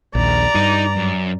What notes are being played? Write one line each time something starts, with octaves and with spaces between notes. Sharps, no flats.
A#1 D#2 D5 A#5
G2 D#4
F#2